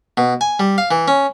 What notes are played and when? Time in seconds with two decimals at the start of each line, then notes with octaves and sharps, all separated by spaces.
0.17 B2
0.41 G#5
0.60 G3
0.78 F5
0.91 E3
1.08 C#4